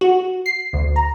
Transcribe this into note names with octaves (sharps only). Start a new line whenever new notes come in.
F#4
C7
D2
A#5